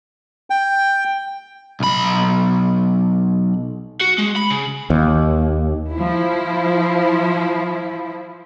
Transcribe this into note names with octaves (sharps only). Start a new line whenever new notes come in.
G5
B1 B5
F#4
G#3
B5
C#3
D#2
F3 E4